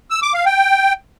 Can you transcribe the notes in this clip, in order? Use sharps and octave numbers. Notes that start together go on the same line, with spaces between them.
E6
D6
F5
G5